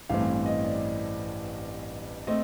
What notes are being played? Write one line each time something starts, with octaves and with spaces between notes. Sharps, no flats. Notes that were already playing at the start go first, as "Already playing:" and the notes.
A1 G2 E3 A3 C4 F5
D#5
D5
A3 C4 D#5